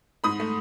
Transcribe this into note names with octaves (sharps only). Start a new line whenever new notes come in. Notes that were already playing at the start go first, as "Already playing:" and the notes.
G#2 B5 D#6
A3